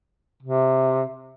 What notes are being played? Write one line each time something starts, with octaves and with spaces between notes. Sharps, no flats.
C3